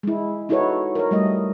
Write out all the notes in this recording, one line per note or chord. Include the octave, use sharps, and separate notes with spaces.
G#3 E4
D#4 E4 F#4 A4 B4 C#5
A#4 C#5
G3 A3 D#5